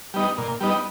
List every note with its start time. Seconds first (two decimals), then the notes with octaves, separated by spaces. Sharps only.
0.14 G3 B3 D#4
0.38 A#2
0.60 G3 B3 D#4